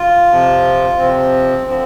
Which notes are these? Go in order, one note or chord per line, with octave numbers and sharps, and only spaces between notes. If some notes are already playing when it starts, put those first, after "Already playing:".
Already playing: F4
F2 C3 F3
F2 C3 F3 C4
D3 F3 C4